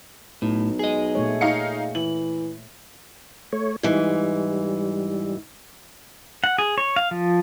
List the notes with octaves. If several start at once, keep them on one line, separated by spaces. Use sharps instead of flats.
B1 A2
G#4 D#5
A#2 A3 C#5
D#4 F5 C#7
E3 F#7
A3 C#5
G#2 E3 G3
F#5
G#4
C#5
F5
F3